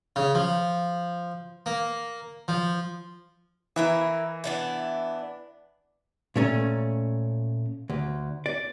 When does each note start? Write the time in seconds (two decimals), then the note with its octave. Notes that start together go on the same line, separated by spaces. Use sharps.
0.16 C#3
0.35 F3
1.66 A#3
2.48 F3
3.76 E3 E4 A#4 E5
4.44 B3 D4 E4
6.36 A#2 A3 C#4 A#5
7.90 D2
8.46 D5